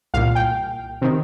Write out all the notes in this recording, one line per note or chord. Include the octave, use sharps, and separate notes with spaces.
C2 A#2 F5
G5
C3 D#3